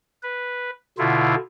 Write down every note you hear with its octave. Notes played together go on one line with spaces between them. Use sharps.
B4
B2 D3 E4 F4